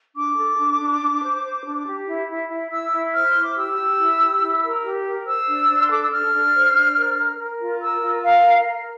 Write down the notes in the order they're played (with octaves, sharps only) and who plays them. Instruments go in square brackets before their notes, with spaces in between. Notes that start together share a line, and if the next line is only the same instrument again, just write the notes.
[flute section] D4 D6
A4
D4
D4
D4
C5
C5
D4
G4
E4
E4
E4
E4 E6
E4
C5 F6
C6
E4
D6
G4 E6
G4
E4
G4
E4
A#4
G4
A#4
C5 E6
D4
D4
C6
A4 D6
E6
D4 F6
D4
C5
D4
A#4
A#4
A#4
F4
A#4 E6
F4
A#4 F5
A#4
A#4